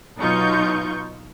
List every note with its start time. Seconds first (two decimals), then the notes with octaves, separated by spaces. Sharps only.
0.18 B2 F#3 D#4 F4 C#6 G6